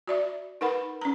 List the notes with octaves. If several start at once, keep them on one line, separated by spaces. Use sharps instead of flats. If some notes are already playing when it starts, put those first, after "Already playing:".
F#4 D5 E5
D#4 A#4 B4 F#5 B5
C#4 A#5